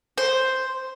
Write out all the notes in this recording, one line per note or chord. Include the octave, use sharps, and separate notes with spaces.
C5